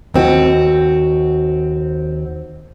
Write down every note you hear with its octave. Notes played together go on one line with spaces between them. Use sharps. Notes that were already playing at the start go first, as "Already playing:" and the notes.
D#2 C4 F#4